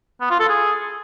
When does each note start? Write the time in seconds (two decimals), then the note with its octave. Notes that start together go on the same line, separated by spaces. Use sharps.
0.21 B3
0.30 F4
0.40 A4
0.49 G#4